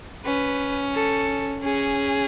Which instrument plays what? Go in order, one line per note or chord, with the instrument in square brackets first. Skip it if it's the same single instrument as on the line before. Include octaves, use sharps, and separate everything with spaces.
[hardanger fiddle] C#4 [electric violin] B4
[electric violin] A4
[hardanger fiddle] C#4 [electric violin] G#4